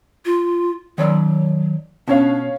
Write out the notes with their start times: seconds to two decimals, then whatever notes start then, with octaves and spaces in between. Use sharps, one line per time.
0.25 F4
0.98 D#3 F#3 C#5 D5
2.08 B2 C#4 D4 C#5 F5